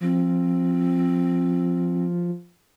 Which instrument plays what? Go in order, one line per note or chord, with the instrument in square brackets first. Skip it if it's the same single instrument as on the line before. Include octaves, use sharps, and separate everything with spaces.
[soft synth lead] F3 [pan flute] C4